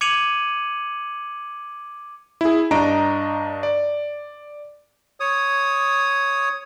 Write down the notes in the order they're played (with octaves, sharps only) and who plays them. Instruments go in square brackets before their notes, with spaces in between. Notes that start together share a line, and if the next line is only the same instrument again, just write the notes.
[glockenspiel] D6 G#6 C#7 D#7 F7 F#7
[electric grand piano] E4 G#4
G2 D4 D#5 A#5 D7
D5
[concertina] C#5 D#6